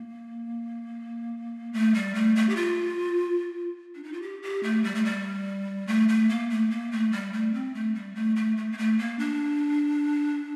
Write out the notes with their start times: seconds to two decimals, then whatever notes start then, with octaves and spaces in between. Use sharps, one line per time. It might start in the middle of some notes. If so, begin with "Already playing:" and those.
Already playing: A#3
1.73 A3
1.94 G3
2.15 A3
2.36 A3
2.49 G4
2.56 F4
3.95 D4
4.04 D#4
4.13 F4
4.22 G4
4.43 G4
4.63 A3
4.84 G3
4.95 A3
5.05 G3
5.87 A3
6.09 A3
6.29 A#3
6.50 A3
6.71 A#3
6.92 A3
7.12 G3
7.33 A3
7.54 C4
7.75 A3
7.95 G3
8.15 A3
8.36 A3
8.57 A3
8.72 A#3
8.78 A3
8.99 A#3
9.19 D4